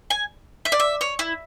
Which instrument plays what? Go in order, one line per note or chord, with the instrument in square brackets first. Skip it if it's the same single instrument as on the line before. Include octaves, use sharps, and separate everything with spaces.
[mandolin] G#5
E5
D5
E5
C#5
E4